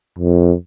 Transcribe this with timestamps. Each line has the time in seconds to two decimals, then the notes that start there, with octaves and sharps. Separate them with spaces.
0.18 F2